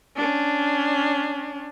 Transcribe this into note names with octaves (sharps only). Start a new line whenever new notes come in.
C#4 D4